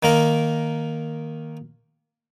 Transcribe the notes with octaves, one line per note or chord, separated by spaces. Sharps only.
D#3 A#3 A#4